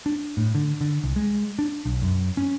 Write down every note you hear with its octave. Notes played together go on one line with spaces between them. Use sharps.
D4
A2
D3
D3
C2
G#3
D4
B1
F#2
C#4